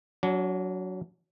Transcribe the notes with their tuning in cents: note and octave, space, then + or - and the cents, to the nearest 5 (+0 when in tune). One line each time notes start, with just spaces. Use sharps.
F#3 +0 D4 -40